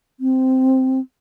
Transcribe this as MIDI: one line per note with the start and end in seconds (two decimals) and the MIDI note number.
0.20 1.00 60